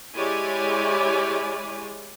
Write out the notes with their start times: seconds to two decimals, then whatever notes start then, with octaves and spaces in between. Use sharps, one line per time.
0.15 G#3 E4 G4 C#5 D5 G#5